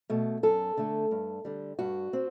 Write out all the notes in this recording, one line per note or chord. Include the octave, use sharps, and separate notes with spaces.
B2 A3
F#2 A4
D3 A3
G2
D3 G3
G2 F#4
C4